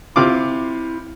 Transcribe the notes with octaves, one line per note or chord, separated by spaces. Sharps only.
C3 E4 F4 D6